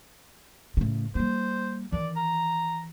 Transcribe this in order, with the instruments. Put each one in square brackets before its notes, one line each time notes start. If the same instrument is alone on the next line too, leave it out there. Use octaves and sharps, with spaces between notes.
[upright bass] A2 C#3
[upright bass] G3 A#3 [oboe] C5
[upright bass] D#3 E3 [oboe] D5
[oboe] A#5